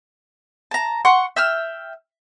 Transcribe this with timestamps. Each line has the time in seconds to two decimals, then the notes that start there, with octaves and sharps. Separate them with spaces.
0.71 A5 A#5
1.05 F#5 C6 C#6 F#6
1.36 E5 G5 E6 F6